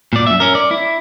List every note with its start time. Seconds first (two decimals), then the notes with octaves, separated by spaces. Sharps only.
0.13 A#2 D5
0.27 F#2 E5
0.40 C#4 A#4
0.55 D5
0.71 E4